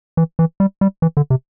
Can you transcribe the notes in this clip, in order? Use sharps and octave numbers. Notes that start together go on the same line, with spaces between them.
E3
E3
G3
G3
E3
D3
C3